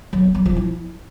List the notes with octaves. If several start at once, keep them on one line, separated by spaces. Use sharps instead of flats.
F#3
B3
F#3
F3
E4